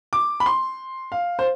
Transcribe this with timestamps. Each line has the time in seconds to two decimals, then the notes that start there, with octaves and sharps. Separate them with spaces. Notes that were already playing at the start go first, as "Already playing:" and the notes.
0.13 D6
0.40 B5
0.46 C6
1.12 F5
1.39 C5